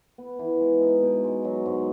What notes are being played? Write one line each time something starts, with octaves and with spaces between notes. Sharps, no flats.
B3
E3
G#3
D#4
B2
G#3
F#3
G#2